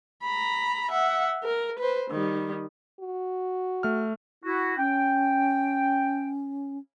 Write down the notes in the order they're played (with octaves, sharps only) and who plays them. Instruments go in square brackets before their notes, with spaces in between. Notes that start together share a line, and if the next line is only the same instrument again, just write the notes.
[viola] A#5 B5
E5 F#5
A#4
B4 C5
D#3 G3
[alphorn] F#4
[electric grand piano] A3 F6
[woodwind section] E4 F#4
[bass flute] C#4 [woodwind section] G5